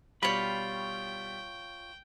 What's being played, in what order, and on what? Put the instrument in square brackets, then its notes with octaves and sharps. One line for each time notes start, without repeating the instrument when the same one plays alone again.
[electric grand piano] B2 G3 [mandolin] F4 C#5 [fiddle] G5 [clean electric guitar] B5